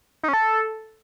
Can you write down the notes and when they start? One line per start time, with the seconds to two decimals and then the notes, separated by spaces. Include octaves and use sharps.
0.23 D#4
0.28 C#4
0.33 A4